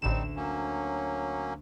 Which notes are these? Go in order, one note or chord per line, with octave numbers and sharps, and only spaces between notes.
A1 D2 G3 C4 D#4 E7
F#3 A#3 C#4